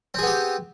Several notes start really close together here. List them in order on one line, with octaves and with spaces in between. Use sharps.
C4 G#4 B3 G4